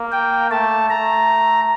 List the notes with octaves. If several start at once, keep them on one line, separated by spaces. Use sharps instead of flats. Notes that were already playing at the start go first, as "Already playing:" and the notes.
Already playing: A#3
G5
A3 A5
A3 A#5